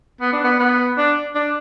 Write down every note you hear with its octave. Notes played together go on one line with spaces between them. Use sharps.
B3
D4
B3
B3
D4
D4